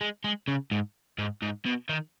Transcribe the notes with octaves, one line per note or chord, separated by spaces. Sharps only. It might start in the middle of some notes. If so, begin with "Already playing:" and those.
G#3
G#3
C#3
G#2
G#2
G#2
B2
D#3